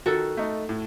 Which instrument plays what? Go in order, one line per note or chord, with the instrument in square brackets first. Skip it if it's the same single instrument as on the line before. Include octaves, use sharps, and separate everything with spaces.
[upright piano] D#3 [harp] F#4 A4
[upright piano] A3 D#4
A2